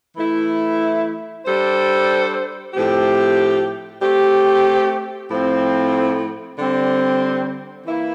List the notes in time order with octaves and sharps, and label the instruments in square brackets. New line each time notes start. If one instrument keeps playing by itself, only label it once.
[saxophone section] E3 A3 E4
G3 D4 A4 C5
A2 F3 A3 C4 G4
A3 C4 G4
A2 F3 C4
D3 G3 C4
E3 A#3 E4